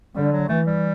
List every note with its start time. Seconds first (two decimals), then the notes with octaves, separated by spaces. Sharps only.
0.16 D3 G3
0.32 F#3
0.49 E3 A3
0.66 G3